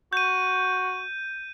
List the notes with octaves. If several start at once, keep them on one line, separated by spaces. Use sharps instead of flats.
F#4 G6 D#7